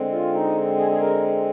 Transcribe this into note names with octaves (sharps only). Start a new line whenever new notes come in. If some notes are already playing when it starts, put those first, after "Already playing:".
Already playing: D3 G#3 C4
F4
D#4
G#4
G#4
A#4